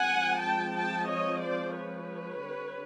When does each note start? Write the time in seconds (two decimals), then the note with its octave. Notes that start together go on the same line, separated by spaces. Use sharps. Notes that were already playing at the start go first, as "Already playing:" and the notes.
Already playing: F3 G#3 C4 F#5 G#5
0.39 G5 A5
0.74 G5 A5
1.08 C#5 D#5
1.43 C5 D5
1.78 B4 C#5
2.46 D3 G3 C4